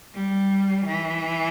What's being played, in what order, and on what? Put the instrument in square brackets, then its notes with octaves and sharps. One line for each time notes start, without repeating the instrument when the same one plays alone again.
[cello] G3
E3